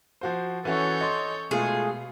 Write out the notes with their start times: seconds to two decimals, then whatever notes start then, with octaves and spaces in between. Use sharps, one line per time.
0.21 F3 F#4 C5
0.65 E3 C#4 F#4 A4 C#5 G6
1.01 D#5 C6
1.51 B2 G#3 A3 F4 G#4